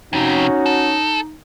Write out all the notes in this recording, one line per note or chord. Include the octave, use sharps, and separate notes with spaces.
F2 C3 C#4 D#4 F#4
A4